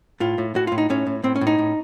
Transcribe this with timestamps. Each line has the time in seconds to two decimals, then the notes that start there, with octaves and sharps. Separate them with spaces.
0.20 A2 F4
0.38 A2
0.55 A2 F#4
0.67 F4
0.72 A2
0.78 D#4
0.90 A2 C#4
1.07 A2
1.23 A2 C4
1.36 C#4
1.41 A2
1.47 D#4
1.59 A2